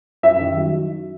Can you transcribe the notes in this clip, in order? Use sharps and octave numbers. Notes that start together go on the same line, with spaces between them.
F#2 E5
D#3
F#3